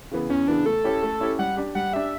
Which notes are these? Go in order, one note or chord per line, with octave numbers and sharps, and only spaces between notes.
C#3 E3 B3
E2 C#4
C#3 E3 B3 D4
A3 A4
C#4 E4 G4 C#5
A3
C#4 E4 G4 C#5
G3 F#5
D4 G4
G3 F#5
D4 G4 E5